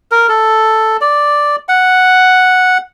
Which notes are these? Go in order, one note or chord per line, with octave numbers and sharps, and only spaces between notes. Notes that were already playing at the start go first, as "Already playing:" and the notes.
A#4
A4
D5
F#5